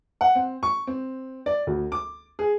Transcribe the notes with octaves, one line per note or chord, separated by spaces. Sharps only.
F#5
C4
C#6
C4
D5
D2
D6
G#4